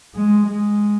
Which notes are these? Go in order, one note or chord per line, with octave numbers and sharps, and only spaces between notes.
G#3
G#3